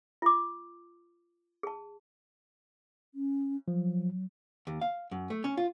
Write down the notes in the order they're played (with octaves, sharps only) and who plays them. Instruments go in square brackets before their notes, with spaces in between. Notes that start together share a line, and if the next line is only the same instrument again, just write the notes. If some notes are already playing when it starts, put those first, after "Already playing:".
[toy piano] F4 D6
G#4 A5
[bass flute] C#4
[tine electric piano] F3 [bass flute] F#3
[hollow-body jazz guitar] D#2
F5
F#2
A3
C#4
F4